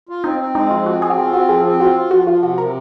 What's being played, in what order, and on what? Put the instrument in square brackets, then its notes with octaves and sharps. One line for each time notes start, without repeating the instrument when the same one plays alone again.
[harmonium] F4
[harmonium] C4 [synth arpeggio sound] D#4
[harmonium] C4
[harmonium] G#3 [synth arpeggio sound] D#4
[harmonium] F3 [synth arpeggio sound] F4
[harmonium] C4 [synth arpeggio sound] F#4
[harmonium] C4 [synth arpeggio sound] G#4
[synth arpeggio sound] F#4
[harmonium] F4 [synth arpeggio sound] G#4
[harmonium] C4 [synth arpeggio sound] F#4
[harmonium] F3 [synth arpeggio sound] G#4
[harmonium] C4
[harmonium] F4 [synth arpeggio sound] F#4
[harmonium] F4
[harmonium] F3 [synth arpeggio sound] F#4
[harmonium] F3 [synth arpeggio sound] F4
[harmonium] C3 [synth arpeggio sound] F#4
[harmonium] C3 [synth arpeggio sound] A#4